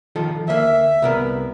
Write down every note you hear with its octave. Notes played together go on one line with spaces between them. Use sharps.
D#3 F3 A4
D2 A#3 E5
C2 B3 A#4